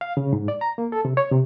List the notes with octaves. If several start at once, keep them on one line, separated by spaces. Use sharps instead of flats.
F5
C#3
G#2
D5
A#5
A#3
A4
C3
C#5
C3